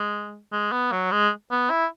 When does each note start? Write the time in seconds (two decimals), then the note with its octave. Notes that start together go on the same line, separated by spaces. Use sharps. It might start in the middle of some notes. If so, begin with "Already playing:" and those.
Already playing: G#3
0.52 G#3
0.72 B3
0.92 F#3
1.11 G#3
1.51 B3
1.70 E4